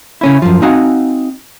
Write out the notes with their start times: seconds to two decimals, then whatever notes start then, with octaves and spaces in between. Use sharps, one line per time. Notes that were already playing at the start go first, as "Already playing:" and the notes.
0.21 C#3 C#4 E4
0.42 F#2 F3
0.62 C4 D#4 F#4 F5 F#5 G#5